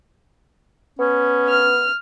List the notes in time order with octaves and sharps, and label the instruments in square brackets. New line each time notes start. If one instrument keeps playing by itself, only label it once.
[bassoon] B3 [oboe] C#4
[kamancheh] F6